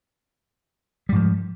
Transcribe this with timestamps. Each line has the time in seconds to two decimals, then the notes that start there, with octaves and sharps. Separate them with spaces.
1.09 G3
1.12 G#2
1.15 F3